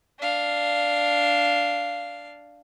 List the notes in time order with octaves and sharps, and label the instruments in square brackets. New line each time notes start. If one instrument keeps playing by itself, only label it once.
[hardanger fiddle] D4 F5